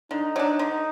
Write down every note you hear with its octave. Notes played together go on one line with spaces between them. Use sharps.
D3 D#4
F#3 D4
D3